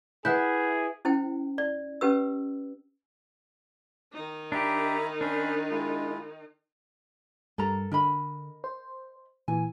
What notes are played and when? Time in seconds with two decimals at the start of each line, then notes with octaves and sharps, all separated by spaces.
0.25 E4 G#4 B4 E5 F#5 F#6 G6
1.05 C#4 E4 C5 G5
1.58 D5
2.01 C#4 G4 B4 E6
4.13 D#3 D#4
4.52 D4 G4 E5 A#5 B5
5.21 C#4 D4 C5 B5
5.71 G#3 E4 F4
7.58 G2 G3 A4 A#4 A#5
7.92 D3 A#4 D#5 B5
8.64 C5
9.48 A#2 E3 G#5